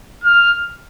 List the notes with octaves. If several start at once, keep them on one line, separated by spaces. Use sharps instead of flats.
F6